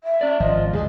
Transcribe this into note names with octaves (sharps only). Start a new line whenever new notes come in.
E5
C#4 D5
G#1 F3 F4 D#5
C#2 F#2 D3 G#4